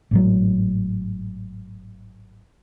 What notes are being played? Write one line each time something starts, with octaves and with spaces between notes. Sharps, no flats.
G#1 A2 F#3